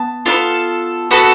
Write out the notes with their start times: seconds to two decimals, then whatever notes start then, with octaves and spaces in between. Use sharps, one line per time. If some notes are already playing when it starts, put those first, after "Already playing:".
Already playing: B3 A5
0.26 D4 F4 A4
0.30 B3
1.11 B3 F#4 A4 B5